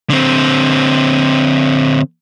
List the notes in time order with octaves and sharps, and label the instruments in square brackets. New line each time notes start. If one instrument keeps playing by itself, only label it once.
[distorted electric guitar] D3 C4